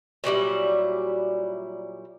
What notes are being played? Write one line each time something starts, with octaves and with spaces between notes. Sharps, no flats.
A#2 F#3 G3 E4